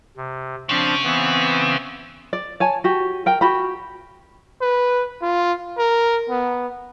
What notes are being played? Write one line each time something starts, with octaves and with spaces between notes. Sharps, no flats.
C3
C#3 F3 C4 D4
E3 B3 C4
D5
C#5 G#5 A5
F#4 G4
A#4 G5
F#4 G4 B5
B4
F4
A#4
B3